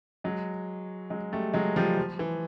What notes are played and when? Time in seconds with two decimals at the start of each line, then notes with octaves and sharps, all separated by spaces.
0.24 F#3 G#3
1.10 F#3 G#3
1.32 G3 A3
1.54 F#3 G#3
1.76 F3 G3
1.97 F3
2.19 E3